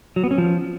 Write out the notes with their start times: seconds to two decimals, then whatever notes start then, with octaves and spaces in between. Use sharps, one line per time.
0.16 F#3
0.24 B3
0.31 C#4
0.38 F3